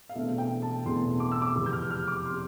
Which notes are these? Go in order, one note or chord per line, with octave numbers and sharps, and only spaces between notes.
F5
E1 E2 B2 A3 C4 E5
G5
A5
E1 E2 B2 A3 C4 C6
D6
E6
D6
F1 E2 C3 D6
G6
F6
F6
D6
C3 C6